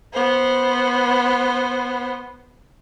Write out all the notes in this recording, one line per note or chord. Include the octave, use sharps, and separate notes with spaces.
B3 C5